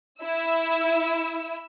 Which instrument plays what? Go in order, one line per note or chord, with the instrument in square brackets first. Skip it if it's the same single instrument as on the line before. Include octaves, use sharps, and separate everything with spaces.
[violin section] E4 E6